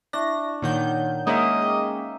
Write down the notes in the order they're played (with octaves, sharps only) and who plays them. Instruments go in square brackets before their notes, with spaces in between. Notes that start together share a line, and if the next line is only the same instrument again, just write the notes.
[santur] D4 [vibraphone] E4 E5 C#6 [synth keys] A#6
[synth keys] A#2 D#3 G6 [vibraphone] C#5 F#5
[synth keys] G#3 A#3 C#4 [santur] D#4 E5 [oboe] D#5
[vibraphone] G5 D6